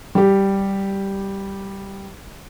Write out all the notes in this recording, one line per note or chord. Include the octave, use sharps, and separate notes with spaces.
G3 G4